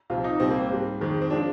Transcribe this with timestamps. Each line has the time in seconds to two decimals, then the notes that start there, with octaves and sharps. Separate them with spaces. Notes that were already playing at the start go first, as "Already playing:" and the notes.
0.10 C2 C3 F3 F4
0.24 D#4
0.40 C2 C3 G3 C4
0.50 A#3
0.60 C4
0.69 G#2 G3
1.00 F2 D#3 G#3
1.21 C4
1.30 F3 G#3 D4